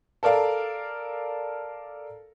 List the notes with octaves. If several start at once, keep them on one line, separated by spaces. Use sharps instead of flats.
A4 A#4 D5 F5